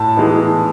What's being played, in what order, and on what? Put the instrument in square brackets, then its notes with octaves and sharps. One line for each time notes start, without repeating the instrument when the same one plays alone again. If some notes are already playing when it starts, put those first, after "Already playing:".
Already playing: [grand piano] A2 [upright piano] A5
[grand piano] E3 G#3 B3 D#4